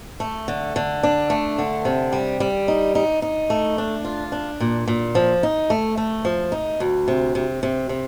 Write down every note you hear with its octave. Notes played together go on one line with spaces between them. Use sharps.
A3
D3
D3
D4
A3
D3
C3
G3
G3
D#4
D#4
D#4
A3
D4
F4
D4
A#2
A#2
F3
D#4
A3
A3
F3
D#4
D2
C3
C3
C3
C3